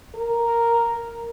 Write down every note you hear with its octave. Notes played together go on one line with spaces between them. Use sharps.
A#4